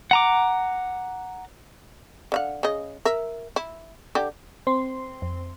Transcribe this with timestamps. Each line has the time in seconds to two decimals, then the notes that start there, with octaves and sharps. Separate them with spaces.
0.11 F#5 A#5 D6
2.32 D3 F5 F#5
2.63 C#3 D#5
3.05 A#4 E5
3.56 E4
4.15 D3 G4
4.67 C4 C5 C6
5.22 F2